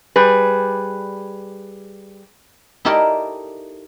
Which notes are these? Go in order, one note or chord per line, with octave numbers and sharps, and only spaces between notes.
G3 G#4 B4
D#4 E4 G4 A4 A#4 D5